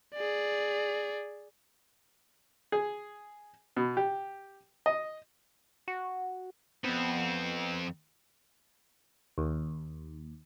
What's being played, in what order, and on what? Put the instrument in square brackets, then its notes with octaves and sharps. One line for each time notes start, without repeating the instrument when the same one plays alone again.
[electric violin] G#4 D5
[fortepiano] G#4
B2
G4
D#5
[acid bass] F#4
[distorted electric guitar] F2 C4 [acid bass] B3
[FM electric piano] D#2